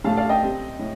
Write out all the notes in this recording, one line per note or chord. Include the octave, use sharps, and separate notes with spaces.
A2 A3 D4 F5 A5
D5 F5
D#5 G5
C3 G3 C4
A2